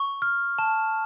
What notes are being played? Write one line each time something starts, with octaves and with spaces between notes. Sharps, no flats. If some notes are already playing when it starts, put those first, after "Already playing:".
Already playing: C#6
F6
A5